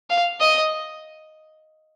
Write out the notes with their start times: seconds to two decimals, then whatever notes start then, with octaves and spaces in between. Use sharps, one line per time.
0.10 F5
0.41 D#5